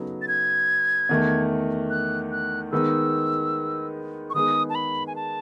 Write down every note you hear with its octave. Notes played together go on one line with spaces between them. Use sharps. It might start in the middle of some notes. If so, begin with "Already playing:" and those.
Already playing: C#3 F#3 B3 D#4 A4
A6
G#6
E2 D#3 A3
F#6
F#6
D#3 G#3 B3 D#4 E6
C#6
D#3 G#3 B3 D#4 G#4 D#6
A5
B5
G#5
A5